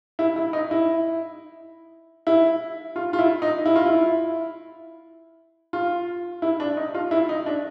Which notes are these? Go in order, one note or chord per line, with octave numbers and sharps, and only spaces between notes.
E4
E4
D#4
E4
E4
F4
F4
E4
D#4
E4
F4
E4
F4
E4
D4
D#4
F4
E4
D#4
D4